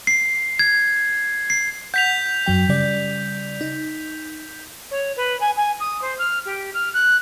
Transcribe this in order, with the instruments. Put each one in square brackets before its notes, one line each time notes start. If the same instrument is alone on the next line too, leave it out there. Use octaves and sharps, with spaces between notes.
[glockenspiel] C7
G#6
C7
[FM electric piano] F#5 [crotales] G6 B6 F7
[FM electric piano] F#2 F#3 G5
C#3 G3 D5
D#4
[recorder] C#5
B4
G#5
G#5
D#6
C5
F6
G4
F6
F#6